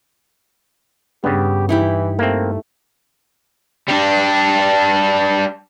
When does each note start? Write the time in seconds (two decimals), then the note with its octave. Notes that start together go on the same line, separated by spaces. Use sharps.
1.24 G2 C#3 B3 G4
1.69 E3 D#4 E4 G4
2.19 A3 A#3 C4
3.89 G3 D4